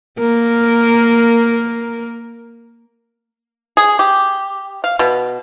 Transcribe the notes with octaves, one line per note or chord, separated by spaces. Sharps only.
A#3 A#4
G#4
G4
F5
B2